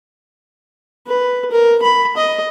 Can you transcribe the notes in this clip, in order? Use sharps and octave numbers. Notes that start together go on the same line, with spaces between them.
B4
A#4
B5
D#5